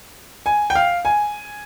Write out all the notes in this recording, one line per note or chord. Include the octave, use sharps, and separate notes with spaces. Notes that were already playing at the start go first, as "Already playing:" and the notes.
G#5
G5
F5
G#5